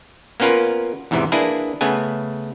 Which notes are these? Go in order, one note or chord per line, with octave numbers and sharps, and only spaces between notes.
A#3 B3 C#4 F4 A#4 B4
E2 G#2 C3 E3
A#3 D4 E4 G#4 B4
C#3 A3 B3 G#5